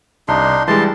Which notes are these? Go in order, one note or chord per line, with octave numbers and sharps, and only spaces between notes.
C2 D4 D#4 C6
E3 G3 G#3 A5 C6